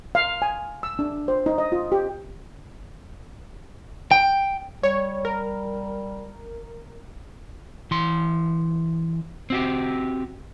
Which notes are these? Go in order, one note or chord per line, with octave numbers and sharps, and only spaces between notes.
F5
G#5
E6
D4
C5
D#4
D#5
F4
G4
G5
G3 C#5
A#4
E3 C6
C4 F#4 G4